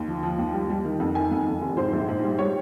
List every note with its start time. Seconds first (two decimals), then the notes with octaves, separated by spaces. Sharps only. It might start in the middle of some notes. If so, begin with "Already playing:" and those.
Already playing: D#2
0.08 F3
0.23 F3
0.38 D#2
0.54 G3
0.70 G3
0.85 D#3
1.00 F2
1.15 D#3 G#5
1.31 F2
1.47 F2
1.61 F1
1.77 G#2 C5
1.93 A#1
2.09 G#2
2.24 G3
2.39 G3 C#5